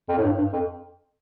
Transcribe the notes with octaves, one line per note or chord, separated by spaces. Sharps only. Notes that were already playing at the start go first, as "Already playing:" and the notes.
F2
A2
G2
G2
F2